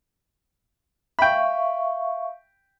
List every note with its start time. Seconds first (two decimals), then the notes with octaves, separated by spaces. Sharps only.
1.19 E5 F5 G5 B5 C#6